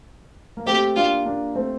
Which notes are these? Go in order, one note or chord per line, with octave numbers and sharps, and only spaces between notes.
A#3
A3 C4 G4
A#3 D4 F4
A#3 D4
A3 C4